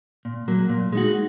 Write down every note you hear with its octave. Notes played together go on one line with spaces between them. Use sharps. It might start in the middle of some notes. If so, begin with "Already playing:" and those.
A#2
F#3 A#3
A#2
G#3 D#4 F#4